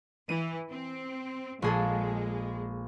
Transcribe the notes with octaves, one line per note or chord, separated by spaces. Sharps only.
E3 D#7
C4
A#1 G#3 G#4 A4